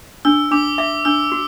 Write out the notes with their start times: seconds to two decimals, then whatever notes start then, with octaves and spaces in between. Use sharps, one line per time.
0.25 D4 E6
0.51 D4 D6
0.78 E5 D6
1.05 D4 E6
1.32 F#4